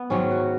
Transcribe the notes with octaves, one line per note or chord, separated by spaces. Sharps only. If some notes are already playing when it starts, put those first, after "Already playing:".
Already playing: B3
G#2 D#3 F#3 C#4
F#4